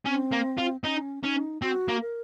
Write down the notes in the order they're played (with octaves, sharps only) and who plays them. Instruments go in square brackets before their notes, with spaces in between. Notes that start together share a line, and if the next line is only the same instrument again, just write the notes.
[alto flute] C4 [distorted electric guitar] C#4
[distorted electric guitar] A#3
F4
[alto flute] C#4 [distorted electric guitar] D#4
[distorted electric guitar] C#4 [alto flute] D#4
[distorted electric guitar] C4 [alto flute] F#4
[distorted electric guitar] A#3
[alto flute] A#4